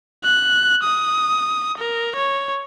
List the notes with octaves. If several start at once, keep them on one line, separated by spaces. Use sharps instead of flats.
F#6
D#6
A#4
C#5